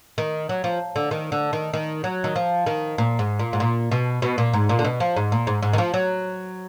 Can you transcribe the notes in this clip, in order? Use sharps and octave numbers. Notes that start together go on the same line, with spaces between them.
D#3
F#3
F3
D3
D#3
D3
D#3
D#3
F#3
D#3
F3
D#3
A#2
G#2
A#2
G#2
A#2
B2
B2
A#2
G#2
A#2
D3
B2
F3
G#2
A#2
G#2
G#2
D#3
F3
F#3